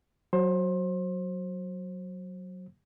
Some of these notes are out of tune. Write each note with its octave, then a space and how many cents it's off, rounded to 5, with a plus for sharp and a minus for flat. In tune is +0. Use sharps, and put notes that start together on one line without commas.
F#3 +0 C5 +25